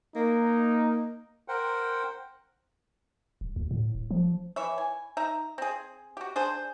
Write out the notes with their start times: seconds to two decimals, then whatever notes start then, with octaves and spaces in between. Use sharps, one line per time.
0.15 A#3 D#4
1.48 A#4 C5 F#5 G5
3.41 D#1
3.56 D2
3.71 A2
3.95 D#1
4.11 F3
4.56 E3 C#5 E5
4.78 G#5
5.17 D#4 E5 A#5
5.58 C4 G#4
6.17 F#4 G4
6.36 D4 G#4 C5